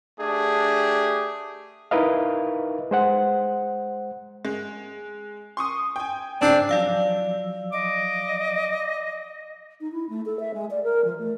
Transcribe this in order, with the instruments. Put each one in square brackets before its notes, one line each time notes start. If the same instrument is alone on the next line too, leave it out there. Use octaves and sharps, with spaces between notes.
[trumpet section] A3 D4 G4 G#4
[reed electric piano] D#4 E4 A#4 B4 D#5 F5
G#3 C5 F#5
[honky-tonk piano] G#3
C6 C#6 D#6
G5 G#5
[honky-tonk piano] G#2 C#3 [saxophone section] C4 D4
[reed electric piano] F3 F#3 [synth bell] D5 F5 E6
[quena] D#5 [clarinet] D6
[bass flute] D#4
E4
A3
A4
E5
G#3
D5
A#4
F3
A3